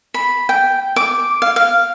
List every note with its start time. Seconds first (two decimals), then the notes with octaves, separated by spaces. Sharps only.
0.14 B5
0.49 G5
0.96 D6
1.42 F5
1.56 F5